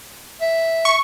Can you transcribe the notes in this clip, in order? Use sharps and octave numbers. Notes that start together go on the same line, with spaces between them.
E5
C#6